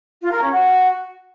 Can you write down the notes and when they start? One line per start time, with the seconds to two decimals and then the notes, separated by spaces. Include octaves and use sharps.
0.21 F4
0.31 A#4
0.41 C#4
0.51 F#4